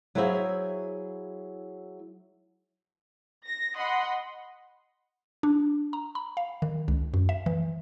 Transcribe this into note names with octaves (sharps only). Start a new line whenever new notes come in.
F#3 E4 G#4 C5 E5 F5
A#6
D#5 F#5 B5 C6
D4
A#5
B5
F5
D#3
C#2
F#2
E5
E3